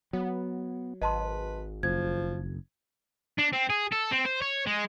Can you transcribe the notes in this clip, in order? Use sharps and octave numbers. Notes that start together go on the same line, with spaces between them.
F#3 B3
G#1 B4 D#5 A5 C6
F#1 F3 G#6
D4
C4
G#4
A4
C4
C5
C#5
G#3